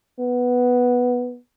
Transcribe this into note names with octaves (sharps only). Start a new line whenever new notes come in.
B3